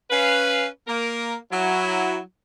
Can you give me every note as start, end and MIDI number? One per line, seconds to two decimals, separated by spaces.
0.11 0.67 61
0.11 0.67 71
0.11 0.67 77
0.88 1.35 58
0.88 1.35 70
1.52 2.19 54
1.52 2.19 64